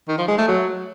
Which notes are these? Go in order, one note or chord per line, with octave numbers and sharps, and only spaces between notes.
D#3
F3
G#3
A3
F#3